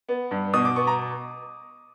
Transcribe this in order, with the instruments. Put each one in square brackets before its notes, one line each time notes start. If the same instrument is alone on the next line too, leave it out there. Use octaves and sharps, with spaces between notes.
[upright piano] B3
G2
B2 D#6
D6
B3 C#6
A#5